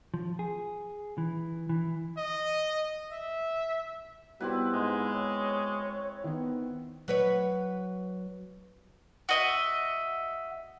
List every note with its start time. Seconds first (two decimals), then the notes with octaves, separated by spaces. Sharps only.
0.14 F3
0.39 G#4
1.18 E3
1.69 E3
2.18 D#5
3.12 E5
4.41 G3 B3 C4 E4 F#4 G4 B4
4.73 G#2 G#3
5.15 C#5
6.24 D#3 B3
7.08 F#3 B4 C#5
9.29 F#4 D#5 E5